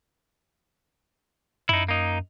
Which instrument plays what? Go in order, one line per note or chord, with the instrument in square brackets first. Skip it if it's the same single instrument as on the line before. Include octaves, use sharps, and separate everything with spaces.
[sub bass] F#2 [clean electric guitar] D#4 E4
[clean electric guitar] A#3 D#4